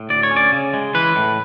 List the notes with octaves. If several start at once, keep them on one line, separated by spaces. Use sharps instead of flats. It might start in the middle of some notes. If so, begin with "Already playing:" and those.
Already playing: A2
D2 D5
C#5
C#4
D5
C#3
G#3
E3 B4
A2